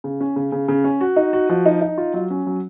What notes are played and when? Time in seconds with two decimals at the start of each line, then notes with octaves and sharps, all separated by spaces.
0.04 C#3
0.21 C#4
0.36 C#3
0.52 C#3
0.68 C#3
0.84 C#4
1.01 F#4
1.16 D#4
1.33 F#4
1.49 F3
1.66 D#4
1.81 D#4
1.98 F4
2.14 F#3
2.31 C#4
2.47 F#3